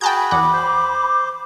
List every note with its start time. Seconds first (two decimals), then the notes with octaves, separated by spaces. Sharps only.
0.01 F#4 G#4 G5 A5 B5 G6
0.31 E2 F#5 D6
0.53 C5